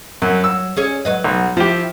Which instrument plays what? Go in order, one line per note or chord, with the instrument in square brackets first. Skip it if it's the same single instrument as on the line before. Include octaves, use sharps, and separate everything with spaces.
[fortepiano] F#2 [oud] F#3
[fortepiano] E6
[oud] C#4 G#4 C#5
F#3 B4 D#5
[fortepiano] B1
[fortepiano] F3 G4 [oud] E4